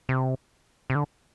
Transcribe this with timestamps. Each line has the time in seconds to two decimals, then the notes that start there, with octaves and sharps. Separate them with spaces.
0.09 C3
0.90 C3
0.95 D3